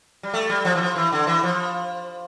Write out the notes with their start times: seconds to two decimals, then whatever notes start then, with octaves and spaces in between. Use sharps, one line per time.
0.23 G3
0.34 A3
0.50 G3
0.65 F3
0.75 E3
0.81 F3
0.96 E3
1.12 D3
1.27 E3
1.43 F3